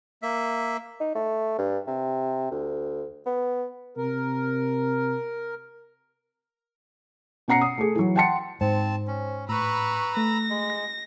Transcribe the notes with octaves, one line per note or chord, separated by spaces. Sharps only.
A#3 E5
D#4
A3
G2
C3
D2
B3
C3 A#4
B2 C#4 F#5 A#5 C7 C#7
D#6
A3 G#4
E3 F#3
F#5 G5 A5 C6 C#7
G#2 C4 C5 A5
C#4
A2 B4 A#5 B5 C#6 E6
A3 A#6
G#3